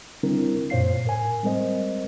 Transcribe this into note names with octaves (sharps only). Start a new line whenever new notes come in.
D3 G3 C4 D4 E4 A#4
F#2 A#2 C5 C#5 F5 C7
A2 A#4 G#5
G3 G#3 C4 A#4 C5 D#5